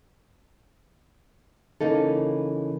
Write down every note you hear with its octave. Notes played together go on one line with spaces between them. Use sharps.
C#3 E3 A#3 D#4 A4